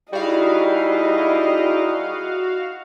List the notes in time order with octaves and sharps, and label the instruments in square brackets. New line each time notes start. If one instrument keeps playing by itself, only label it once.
[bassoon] G3 [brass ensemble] D#4 E4 G#4 [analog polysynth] F#4 F5 [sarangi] D#5